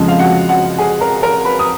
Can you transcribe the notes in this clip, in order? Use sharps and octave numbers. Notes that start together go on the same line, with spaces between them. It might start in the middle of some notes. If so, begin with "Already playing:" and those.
Already playing: F2 C#3 F3 G#3
F5
F#4 F#5
F#4 F#5
G#4 G#5
A#4 A#5
A#4 A#5
B4 B5
D#6